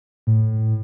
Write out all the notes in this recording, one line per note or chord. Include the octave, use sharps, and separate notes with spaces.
A2